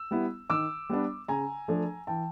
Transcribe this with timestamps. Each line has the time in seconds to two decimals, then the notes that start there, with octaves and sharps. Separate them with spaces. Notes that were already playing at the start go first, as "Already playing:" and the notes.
Already playing: E6
0.11 G3 B3 E4
0.50 D#3 D6 E6
0.89 G3 B3 D4
1.28 C#3 G#5 A#5
1.68 F3 A3 D4
2.07 E3 G5 A5